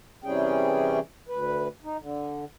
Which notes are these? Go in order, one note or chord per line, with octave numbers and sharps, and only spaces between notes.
C3 E3 G3 C#4 G#4 G5
D2 B4
D#4
D3